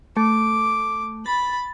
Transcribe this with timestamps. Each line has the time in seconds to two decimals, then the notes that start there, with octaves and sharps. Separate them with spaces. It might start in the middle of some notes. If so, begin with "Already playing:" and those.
0.17 A3 D6
1.26 B5 A6